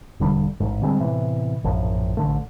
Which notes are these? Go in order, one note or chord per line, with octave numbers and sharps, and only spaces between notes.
E1 D3 G3
A1 G#2
D3 G3 G#3 C4
A2 C3 E3 B3
A#1 F#2 A2 F3
A1 D3 A3